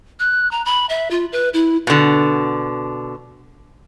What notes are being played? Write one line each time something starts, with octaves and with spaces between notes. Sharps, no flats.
F#6
A#5
B5
E5
F4
B4
E4
B2 D3